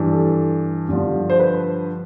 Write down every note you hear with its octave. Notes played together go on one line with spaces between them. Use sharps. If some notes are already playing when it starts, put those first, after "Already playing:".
Already playing: G2 E3
A4
G2 D3 F3
C5
B4